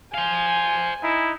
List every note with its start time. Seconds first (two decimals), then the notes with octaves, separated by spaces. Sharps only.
0.14 C5 F5 G#5
1.02 D#4 E4